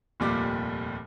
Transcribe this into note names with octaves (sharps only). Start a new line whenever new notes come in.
F1 D#2 A#2 G3 D6